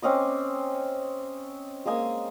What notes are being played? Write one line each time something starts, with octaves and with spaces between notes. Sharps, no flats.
C4 C#4 D#5 D6
G#3 A#3 D#5 G#5